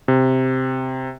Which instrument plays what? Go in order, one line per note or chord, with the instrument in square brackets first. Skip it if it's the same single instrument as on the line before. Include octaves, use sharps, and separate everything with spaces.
[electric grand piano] C3